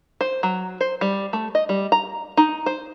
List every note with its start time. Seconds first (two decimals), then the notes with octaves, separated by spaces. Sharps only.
0.21 C5
0.43 F#3
0.81 C5
1.01 G3
1.33 A3
1.55 D#5
1.69 G3
1.92 A#5
2.37 D#4
2.66 C5